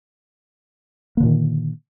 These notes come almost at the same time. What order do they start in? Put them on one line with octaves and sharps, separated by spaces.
A#3 D3 A#2 D#3